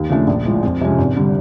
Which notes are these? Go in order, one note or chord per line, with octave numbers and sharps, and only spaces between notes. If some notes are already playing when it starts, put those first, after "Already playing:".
Already playing: D#2
C#3 F3 A3 D4
A#1
A2 F3 G#3
F2
C3 F3 G#3 C#4
G#1
D3 G3